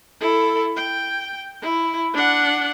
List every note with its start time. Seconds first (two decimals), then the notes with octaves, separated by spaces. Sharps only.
0.20 E4 A4
0.77 G5
1.62 E4
2.14 D4 F#5